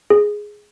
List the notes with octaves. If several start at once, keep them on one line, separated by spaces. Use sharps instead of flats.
G#4